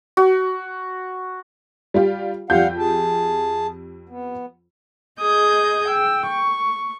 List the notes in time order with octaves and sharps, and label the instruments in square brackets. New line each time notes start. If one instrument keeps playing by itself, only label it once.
[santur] F#4
[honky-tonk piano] G3 F4 G4
[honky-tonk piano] F2 G4 G6 [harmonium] G3 F5 F#5
[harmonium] G#4 A5
B3
[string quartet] G#4 D#5 D#6 G6 G#6
G5 E6
C#6